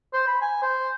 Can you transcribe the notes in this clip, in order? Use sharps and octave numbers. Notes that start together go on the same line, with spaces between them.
C5
B5
G#5
C5